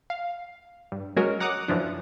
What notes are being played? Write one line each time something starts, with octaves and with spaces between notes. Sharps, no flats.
F5
G2
F#3 G#3 C#4 F#4 A#4
F#5 A#5 D6 D#6 F#6
F#2 E3 F3 D4